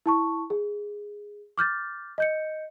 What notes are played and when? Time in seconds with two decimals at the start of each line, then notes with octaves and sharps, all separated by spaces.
0.06 E4 A5 C#6
0.50 G#4
1.58 D6 F6 G6 A6
2.18 D#5 G6 C#7